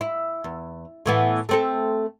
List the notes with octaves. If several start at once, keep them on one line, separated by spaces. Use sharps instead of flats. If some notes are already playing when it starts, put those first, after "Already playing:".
E4
E2
A2 E3 B3
A3 C4 A4